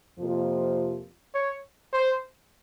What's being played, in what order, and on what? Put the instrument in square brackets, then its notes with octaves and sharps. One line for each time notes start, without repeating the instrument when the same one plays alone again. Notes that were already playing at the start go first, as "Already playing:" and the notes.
[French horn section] F2 C3 F3 A#3 F4
[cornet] C#5
C5